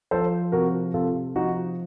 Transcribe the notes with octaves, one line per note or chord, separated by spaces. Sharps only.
F3 A4 C5
C3 F#4 A#4
C3 F4 A4
F3 D#4 F#4